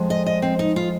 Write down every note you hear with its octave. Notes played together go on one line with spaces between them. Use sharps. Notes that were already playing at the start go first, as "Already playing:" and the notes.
Already playing: F2 F3 G#3
D#5
D#5
C4
D#4
F4